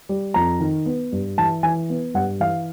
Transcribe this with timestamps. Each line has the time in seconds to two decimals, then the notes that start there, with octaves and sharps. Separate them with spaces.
0.09 G3
0.34 F2 A#5
0.60 D#3
0.86 B3
1.12 G2
1.38 E3 A5
1.63 E3 G#5
1.90 B3
2.14 G2 F#5
2.40 E3 F5